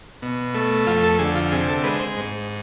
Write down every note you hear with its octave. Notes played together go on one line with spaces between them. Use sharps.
B2
A3
F2 F4
A4
D3 G#4
F4
C3 G#4
A4
G#3 B4
C5
G#2